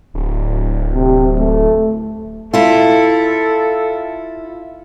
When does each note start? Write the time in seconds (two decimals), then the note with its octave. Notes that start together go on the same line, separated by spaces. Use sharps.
0.14 D1
0.94 C3
1.39 A3
2.53 E4 F4 A4